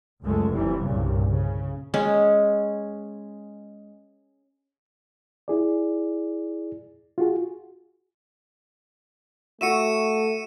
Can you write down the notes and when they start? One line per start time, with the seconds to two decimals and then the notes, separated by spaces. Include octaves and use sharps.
0.23 C#2 F#2 G#3 A3
0.52 F1 C3 E3 G3
0.84 C2 G2 A#2 C#3
1.30 C#3
1.94 G#3 C#4
5.48 E4 G#4 D5
7.18 F4 F#4 G#4
9.61 A3 F#4 E5 C#7 D#7 E7